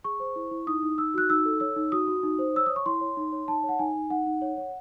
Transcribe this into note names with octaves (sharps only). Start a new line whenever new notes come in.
G#4 C#6
C5
E4
E4
D#4 D#6
D#4
D#4 E6
F#4 F#6
D#4 E6
A4
C#5 E6
D#4
F#4 D#6
F#4
D#4
C5
C#5 E6
C#5 D#6
C#6
E4 C6
C#5
D#4
C#5
D#4 A5
C#5
F#5
D#4 G#5
D#4
D#4 F#5
D#4
C#5
C#5